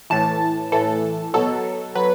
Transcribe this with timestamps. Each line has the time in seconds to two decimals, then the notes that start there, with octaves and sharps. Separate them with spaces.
0.10 A2 E3 A5
0.72 A2 E3 A4
1.34 B2 F#3 A4
1.95 F#3 B4